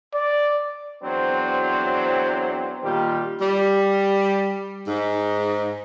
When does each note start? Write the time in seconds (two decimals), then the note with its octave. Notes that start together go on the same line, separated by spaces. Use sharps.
0.14 D5
1.03 E2 F#3 C4 D4 C5
2.83 A#2 D#3 G3 F4 G4
3.41 G3
4.87 G#2